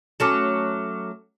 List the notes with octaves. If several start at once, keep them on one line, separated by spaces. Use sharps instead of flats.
F#3 A3 C#4 D6 F6 E7